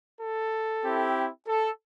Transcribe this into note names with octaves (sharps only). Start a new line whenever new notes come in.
A4
C4 E4 G4
A4